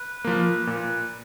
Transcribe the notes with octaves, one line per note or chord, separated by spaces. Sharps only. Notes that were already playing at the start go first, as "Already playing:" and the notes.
Already playing: B4
F3 A#3
A#2